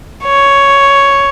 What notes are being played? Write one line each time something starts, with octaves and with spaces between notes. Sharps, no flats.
C#5